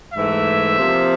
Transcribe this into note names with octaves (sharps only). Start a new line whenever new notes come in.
G#2 E3 A3 E5
C3 F3 A#3